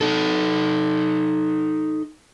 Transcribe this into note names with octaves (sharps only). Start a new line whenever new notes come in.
D#4 A4